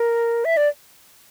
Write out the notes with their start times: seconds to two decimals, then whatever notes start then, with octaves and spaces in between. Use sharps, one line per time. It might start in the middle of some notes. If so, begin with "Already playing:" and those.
Already playing: A#4
0.45 E5
0.57 D5